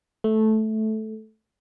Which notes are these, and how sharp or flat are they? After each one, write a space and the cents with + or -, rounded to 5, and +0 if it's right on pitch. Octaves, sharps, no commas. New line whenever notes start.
A3 -10